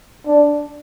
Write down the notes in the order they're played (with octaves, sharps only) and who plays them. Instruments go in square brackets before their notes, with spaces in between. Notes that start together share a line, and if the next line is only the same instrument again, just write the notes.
[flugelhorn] D4